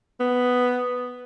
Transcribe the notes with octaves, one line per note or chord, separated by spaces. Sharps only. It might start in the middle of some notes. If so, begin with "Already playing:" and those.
B3